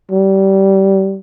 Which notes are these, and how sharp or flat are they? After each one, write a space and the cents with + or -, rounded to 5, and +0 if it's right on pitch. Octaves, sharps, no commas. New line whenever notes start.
G3 -20